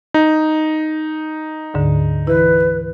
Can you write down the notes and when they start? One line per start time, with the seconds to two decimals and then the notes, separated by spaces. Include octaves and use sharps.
0.14 D#4
1.74 D2 G#2 D3
2.27 E3 E4 B4